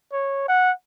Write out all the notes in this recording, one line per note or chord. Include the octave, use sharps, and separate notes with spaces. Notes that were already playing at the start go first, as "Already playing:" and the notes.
C#5
F#5